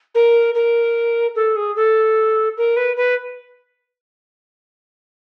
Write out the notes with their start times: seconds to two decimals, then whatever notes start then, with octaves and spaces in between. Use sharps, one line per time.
0.15 A#4
0.54 A#4
1.35 A4
1.56 G#4
1.76 A4
2.57 A#4
2.76 B4
2.96 B4